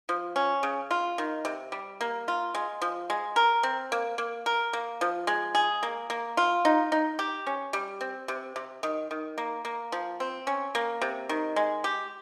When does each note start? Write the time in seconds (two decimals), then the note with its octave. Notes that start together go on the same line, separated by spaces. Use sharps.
0.09 F3
0.36 C#4
0.63 C#3
0.91 F4
1.18 D#3
1.45 C3
1.72 G3
2.01 A#3
2.28 F4
2.55 G#3
2.82 F3
3.10 G#3
3.36 A#4
3.63 C4
3.92 A#3
4.18 A#3
4.46 A#4
4.73 A#3
5.01 F3
5.27 G#3
5.55 G#4
5.83 A#3
6.10 A#3
6.37 F4
6.65 D#4
6.92 D#4
7.19 G4
7.47 C#4
7.73 G3
8.01 C4
8.28 C3
8.56 C3
8.83 D#3
9.11 D#3
9.38 A#3
9.65 A#3
9.92 F3
10.20 C4
10.47 C#4
10.75 A#3
11.01 C3
11.29 D#3
11.56 G#3
11.84 G4